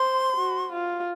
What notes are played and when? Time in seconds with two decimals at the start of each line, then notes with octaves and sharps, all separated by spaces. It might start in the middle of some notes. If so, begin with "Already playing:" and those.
Already playing: C5 C6
0.37 F#4
0.72 F4